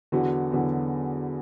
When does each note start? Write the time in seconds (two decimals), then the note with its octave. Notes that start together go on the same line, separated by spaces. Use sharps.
0.12 E2 D3 F#3 B3 F#4
0.51 E2 D3 F#3 B3 F#4